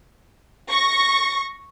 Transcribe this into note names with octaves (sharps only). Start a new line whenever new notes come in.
C#6 A#6